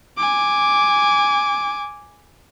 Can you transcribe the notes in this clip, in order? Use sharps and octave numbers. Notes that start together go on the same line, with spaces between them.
G#5 D6